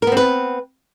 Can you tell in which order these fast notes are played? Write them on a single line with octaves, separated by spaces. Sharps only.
A#4 B3 C4 B4